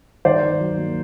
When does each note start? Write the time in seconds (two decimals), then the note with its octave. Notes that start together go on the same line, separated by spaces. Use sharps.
0.25 D#3 C5 D5
0.43 D#3
0.60 F#3
0.78 A#3